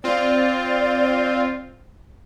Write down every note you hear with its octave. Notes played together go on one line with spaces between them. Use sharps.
C4 F4 D5